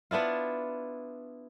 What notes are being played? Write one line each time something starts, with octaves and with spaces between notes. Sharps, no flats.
B3 D4 E4 F4